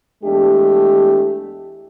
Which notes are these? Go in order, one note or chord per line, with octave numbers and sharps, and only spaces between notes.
E2 G#3 A3 D4 G4